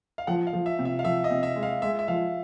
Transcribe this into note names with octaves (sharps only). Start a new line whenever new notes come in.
F5
F3 F#5
F5
F3
E5
C3
E5
F5
F3 E5
D#5
C3
E5
G#3
F5
G#3 E5
E5
F3 F5